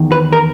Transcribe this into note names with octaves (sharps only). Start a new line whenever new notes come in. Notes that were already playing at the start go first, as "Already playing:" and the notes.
Already playing: E2 D#3
B4
A#4